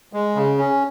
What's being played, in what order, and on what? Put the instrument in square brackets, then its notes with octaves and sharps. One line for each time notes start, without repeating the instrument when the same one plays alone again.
[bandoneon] G#3
C#3
C#4